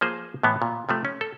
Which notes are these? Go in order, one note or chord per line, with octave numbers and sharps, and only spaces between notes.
F3 A#3 G#4 C5
A2 E3 B3
A#2
C3 F3 A3
C#4
A4